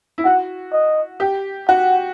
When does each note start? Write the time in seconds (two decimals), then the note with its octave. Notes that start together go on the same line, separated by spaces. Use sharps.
0.18 E4
0.24 F#4 F#5
0.73 D#5
1.20 G4
1.68 F#4 F#5